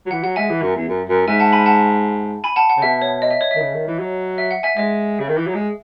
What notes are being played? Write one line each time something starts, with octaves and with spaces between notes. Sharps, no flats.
F#3
E3 F#5
F#3 F#5
G#3 E5 G#5
E3
F#2
E2
F#2
F#2
G#2 E5 G#5
F#5 A5
G#5 B5
F#5 A5
G#5 B5
F#5 A5
F#5
C#3
B2 E5
C#5
D#5
E5
C#5
E5
D#3
C#3
D#3
E3
F#3
E5
F#5
E5 G#5
G#3 E5
C#3
D#3
E3
F#3
G#3